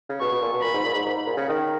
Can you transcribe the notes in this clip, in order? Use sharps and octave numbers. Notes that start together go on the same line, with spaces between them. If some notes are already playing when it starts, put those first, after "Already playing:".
C#3
B2 C#6
B2
A#2
B2
A#2 B5
G#2
A#2
G#2
G#2
G#2
A#2
C#3
D#3